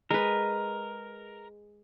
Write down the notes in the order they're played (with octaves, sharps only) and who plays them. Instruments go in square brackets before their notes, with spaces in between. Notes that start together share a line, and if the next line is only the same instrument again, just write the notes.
[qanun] G#3 B4 [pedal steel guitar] A#4